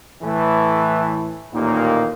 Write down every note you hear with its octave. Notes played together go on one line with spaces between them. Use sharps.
A2 E3 A3
A1 D#2 A#2 D#3 A#3 D#4